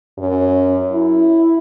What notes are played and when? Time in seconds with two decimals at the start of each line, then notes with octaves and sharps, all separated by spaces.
0.18 F#2
0.92 E4